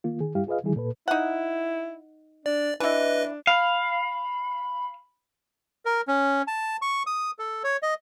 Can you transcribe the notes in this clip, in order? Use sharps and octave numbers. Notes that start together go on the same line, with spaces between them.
D#3 A#3 F4
D#3 G#4
G2 G3 E4 G4 F5
F4 G#4 B4 D#5 F5
D3 D#3 F3 G3 E4 G#4
A#2 A4 B4
D#4 E4 F#5
D4 D5
E3 D4 E4 B4 D#5
F5 B5
A#4
C#4
A5
C#6
D#6
A4
C#5
D#5